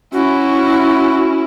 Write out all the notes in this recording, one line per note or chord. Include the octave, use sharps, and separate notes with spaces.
C#4 E4 F#4